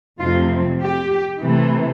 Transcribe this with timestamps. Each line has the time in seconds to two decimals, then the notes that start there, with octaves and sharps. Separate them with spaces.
0.20 F2 C3 F3 A3 C4 F4
0.81 G4
1.42 C3 E3 A3